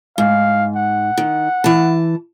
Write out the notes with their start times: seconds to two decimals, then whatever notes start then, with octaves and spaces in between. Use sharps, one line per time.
0.18 G#2 F5
0.76 F#5
1.18 D#3
1.64 E3 A5